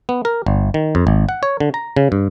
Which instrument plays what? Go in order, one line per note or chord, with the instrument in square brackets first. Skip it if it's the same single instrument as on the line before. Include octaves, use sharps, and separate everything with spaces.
[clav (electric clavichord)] B3
A#4
G1
D#3
F2
G#1
F#5
C#5
D3
A#5
C#3
G2